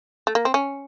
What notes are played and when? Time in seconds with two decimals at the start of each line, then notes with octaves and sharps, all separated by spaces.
0.27 A3
0.35 A#3
0.45 C4
0.54 C#4